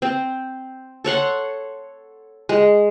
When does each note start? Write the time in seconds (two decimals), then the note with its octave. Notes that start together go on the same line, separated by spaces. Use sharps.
0.02 C4
1.04 A4 C#5 F#5 C6
2.49 G#3